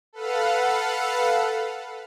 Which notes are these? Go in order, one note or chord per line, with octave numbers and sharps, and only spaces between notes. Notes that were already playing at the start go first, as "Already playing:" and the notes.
A4 B4 F5 F#5